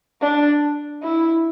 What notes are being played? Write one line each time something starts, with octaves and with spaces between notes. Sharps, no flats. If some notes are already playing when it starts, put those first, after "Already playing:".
D4
E4